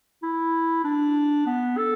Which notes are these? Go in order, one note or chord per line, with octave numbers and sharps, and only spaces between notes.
E4
D4
B3
A4